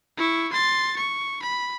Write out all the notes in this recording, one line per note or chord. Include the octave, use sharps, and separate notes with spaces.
E4 C#6
C6 A6
C#6
B5